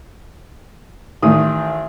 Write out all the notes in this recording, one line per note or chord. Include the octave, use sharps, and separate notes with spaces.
A1 D#3 D#6